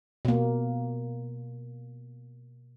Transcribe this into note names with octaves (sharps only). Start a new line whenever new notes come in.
B2 A#3